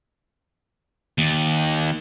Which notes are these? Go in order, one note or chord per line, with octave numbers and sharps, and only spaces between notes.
D#2